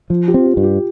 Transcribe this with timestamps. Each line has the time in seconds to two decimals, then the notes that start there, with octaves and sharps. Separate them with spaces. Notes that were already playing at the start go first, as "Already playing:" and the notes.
0.10 F3 F4
0.28 G4
0.34 C4 F4
0.46 G4
0.57 G2
0.63 G4